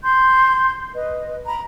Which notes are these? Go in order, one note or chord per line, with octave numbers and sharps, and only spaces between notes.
C6 G6
B4 D#5
A#5 B5